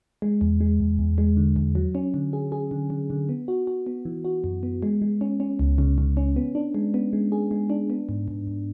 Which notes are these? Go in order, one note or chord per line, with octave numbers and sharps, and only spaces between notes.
G#3
E2
G#3
E2
E2
G#3
D3
E2
F#3
C#4
D3
G#4
G#4
D3
D3
D3
B3
F#4
F#4
B3
E3
F#4
F#2
B3
G#3
G#3
C#4
C#4
C#2
C#3
C#3
C#4
B3
D4
G#3
B3
G#3
G#4
G#3
D4
B3
G#2
G#2
G#2